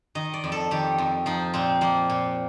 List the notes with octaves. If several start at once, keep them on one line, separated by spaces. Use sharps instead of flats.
D#3 D#5
D5
F2
A4
D#3 G4
F2
F3 D#4
A#2 C4
F3 A#3
A#2